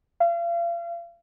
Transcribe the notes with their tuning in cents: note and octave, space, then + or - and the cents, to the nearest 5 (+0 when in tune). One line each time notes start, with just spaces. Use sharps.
F5 -40